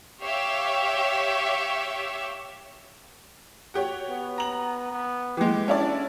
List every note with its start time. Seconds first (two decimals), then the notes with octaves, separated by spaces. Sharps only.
0.22 G4 C#5 E5 F5
3.74 F#4 G4 C#5
4.09 B3
4.38 A#5 F#7
4.92 B3
5.37 E3 G#3 G4
5.68 C#4 D4 E4 D5